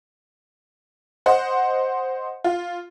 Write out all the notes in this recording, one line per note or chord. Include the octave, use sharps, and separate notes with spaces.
C5 D#5 F#5
F4